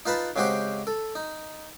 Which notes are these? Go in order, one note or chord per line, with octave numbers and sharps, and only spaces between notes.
D#4 F4 B4 A5 B5
C#3 G#3 C4 F#4 G4 C5
A4
D#4